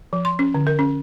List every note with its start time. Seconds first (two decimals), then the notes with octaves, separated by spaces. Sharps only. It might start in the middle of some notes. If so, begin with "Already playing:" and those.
0.13 F3
0.25 C6
0.39 C#4
0.54 D3
0.67 A#4
0.79 C#4